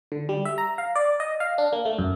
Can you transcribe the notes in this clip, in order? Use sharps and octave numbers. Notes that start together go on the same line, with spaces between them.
D3
G3
E5
A#5
F5
D5
D#5
F5
D4
A#3
A3
F#2